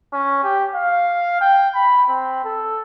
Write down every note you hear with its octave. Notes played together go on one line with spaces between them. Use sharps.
C#4
G4
F5
G5
B5
C4
A4